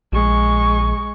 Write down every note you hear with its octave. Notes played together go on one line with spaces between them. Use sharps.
A#1 G#3 C#6